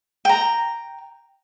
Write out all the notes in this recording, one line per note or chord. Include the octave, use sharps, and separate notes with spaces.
G5 A#5